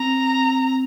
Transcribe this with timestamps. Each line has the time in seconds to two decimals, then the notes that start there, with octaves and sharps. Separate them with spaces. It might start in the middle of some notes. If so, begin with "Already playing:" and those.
Already playing: C4 A#5